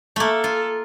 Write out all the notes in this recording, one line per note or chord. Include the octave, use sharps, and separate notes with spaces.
A3 A#3 A4
F4